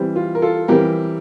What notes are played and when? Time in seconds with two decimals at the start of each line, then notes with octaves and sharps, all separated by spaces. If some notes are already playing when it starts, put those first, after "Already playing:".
Already playing: E3 G3 C4
0.16 F4
0.35 A#4
0.42 F4 A4
0.68 E3 G3 C4 G4 A#4